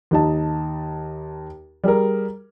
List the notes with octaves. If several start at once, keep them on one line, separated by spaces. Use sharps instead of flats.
D#2 D#4 A5
G3 G#4 A#4